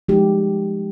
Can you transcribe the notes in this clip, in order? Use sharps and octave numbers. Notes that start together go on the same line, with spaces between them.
F3 G#3 D#4 G4